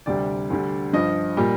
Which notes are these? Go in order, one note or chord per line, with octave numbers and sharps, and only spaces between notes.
D2 C3 G3 D5
D2 D3 G3
G2 F3 D#5
A#2 G3